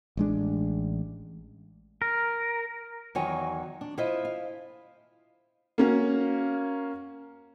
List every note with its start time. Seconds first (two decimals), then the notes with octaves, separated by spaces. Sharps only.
0.17 A1 G#3 D4
2.02 A#4
3.15 E2 D#3 F#3 C#5 G#5
3.81 D4
3.98 E4 F4 C5 D#5 E5
4.25 F5
5.78 A#3 C#4 F#4